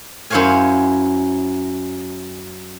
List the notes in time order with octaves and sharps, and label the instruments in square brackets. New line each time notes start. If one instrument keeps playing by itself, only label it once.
[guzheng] F#2 E4 C5 C#5 F5 G#5